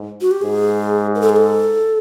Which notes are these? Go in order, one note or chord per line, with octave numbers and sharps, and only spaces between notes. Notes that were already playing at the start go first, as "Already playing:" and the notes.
Already playing: G#2
F#4
G4
G#2 G#4
A#4
A4
G#4
A4